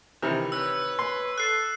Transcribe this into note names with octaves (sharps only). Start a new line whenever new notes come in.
C3 D#3 E3
B4 C#5 E6
C6
A4 F#6 C7